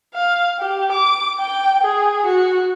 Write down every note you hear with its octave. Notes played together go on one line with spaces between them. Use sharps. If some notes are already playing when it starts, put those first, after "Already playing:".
F5
G4
D6
G5
G#4
F#4